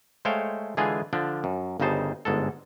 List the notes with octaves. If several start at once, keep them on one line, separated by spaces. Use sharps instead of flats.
G#3 A3 C5 C#5 F5 G5
D3 E3 G#3 F4 G#4 G#5
D3 F3 D4
F#2
G1 G2 C#3 D#4 C5 A5
G1 G#2 G#3 A4